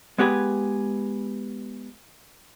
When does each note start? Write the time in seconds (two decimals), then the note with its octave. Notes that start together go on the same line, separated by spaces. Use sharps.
0.18 G#3 B3 G4 G#4 B4